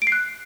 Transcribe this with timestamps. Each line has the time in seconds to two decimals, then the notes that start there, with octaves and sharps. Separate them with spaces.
0.02 D7
0.07 C7
0.12 F#6